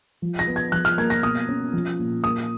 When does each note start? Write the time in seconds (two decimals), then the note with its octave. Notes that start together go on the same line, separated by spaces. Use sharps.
0.22 F3
0.39 A#6
0.47 B3
0.56 G#6
0.72 F3 F#6
0.85 F6
0.98 A#3 G#6
1.10 A#6
1.23 B2 D#6
1.49 C#4
1.73 F3
1.99 A#2
2.24 A#3 D#6